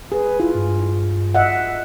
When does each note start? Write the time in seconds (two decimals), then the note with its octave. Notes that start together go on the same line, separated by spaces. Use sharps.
0.12 G#4 B4
0.40 E4 F4
0.55 G2
1.35 D#5 E5 F#5